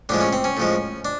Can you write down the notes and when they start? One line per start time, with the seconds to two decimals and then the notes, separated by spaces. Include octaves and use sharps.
0.09 A2 F3 G#3 D4
0.21 C#4
0.33 C4
0.44 C#4
0.57 A2 F3 G#3
1.05 D4